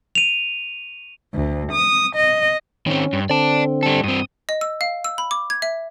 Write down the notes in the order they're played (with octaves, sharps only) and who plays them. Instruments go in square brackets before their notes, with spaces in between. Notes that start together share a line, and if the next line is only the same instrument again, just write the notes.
[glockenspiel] D#7 F7
[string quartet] D2
D#6
D#5
[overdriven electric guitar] D#3 C4 [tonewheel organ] C#4
[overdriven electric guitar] G2
[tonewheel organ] D3 C4 [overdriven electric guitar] D5 A5
[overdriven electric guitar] G3 A4
[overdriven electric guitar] G2 C4 [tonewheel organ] D#6
[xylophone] D#5
E6
F5
E6
B5
D6
G#6
E5